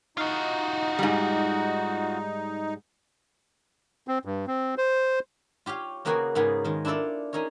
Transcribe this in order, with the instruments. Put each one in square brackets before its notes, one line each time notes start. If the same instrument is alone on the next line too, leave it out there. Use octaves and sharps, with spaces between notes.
[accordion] D#4 [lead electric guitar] F4 F#4
[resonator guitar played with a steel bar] G#2 G3
[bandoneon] C4
G2
C4
C5
[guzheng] F4 G4 C#5 F5
C#3 A#3 B3 F#4 G#4 G5
G#2 C#3 A#3 B3 G#4
D#3 G#3
D4 E4 F4 A4 D5
C#4 D#4 G#4 A#4 C#5